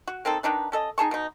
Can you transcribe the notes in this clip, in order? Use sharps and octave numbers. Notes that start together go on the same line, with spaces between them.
F#4
A#3 C4 D#4 A4
D#3 D4 D#4 B4
C#4 A4 D#5
D#4 G#4 A5 C#6
B2 D#4